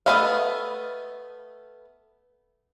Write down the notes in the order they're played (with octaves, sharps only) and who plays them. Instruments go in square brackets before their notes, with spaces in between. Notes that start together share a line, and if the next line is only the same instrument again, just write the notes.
[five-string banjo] A3 B3 B4 D#5 F5